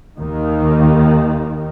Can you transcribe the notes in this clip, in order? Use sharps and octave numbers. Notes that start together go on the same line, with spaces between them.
D#2 D#3